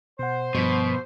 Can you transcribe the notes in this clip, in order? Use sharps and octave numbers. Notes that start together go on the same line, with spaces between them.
B2 C5 F#5
G2 B2 F3 B6